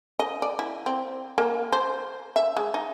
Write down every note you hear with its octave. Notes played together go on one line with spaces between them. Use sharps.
D#5
D5
E4
C4
A#3
C5
E5
G#3
D#4